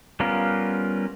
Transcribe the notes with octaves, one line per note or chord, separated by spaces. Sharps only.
G3 B3 C#4 F4 A#4